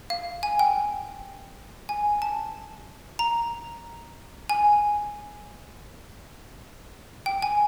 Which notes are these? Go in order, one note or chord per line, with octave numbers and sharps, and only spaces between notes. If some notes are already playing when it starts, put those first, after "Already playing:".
F5
G#5
G5
G#5
A5
A#5
G#5
G5
G#5